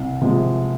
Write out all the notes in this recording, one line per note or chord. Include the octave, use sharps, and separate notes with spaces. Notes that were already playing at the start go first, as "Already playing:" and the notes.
Already playing: C2
C3 F3 G#3